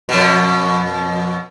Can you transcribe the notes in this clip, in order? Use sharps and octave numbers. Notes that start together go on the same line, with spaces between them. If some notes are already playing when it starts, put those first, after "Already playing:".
F2 B2